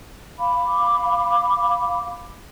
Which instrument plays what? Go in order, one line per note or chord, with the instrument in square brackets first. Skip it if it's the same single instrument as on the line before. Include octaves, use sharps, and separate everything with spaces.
[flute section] F5 B5 D6